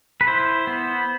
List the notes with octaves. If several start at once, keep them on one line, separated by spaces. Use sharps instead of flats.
B4
E4 C5
B3